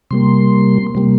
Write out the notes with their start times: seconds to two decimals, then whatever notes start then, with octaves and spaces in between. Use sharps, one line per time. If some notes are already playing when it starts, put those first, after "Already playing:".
0.11 C3 G3 A#3 C6
0.95 C3 G3 A#3